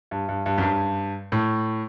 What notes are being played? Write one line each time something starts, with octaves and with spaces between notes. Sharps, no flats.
G2
G2
G2
F#2
G2
A2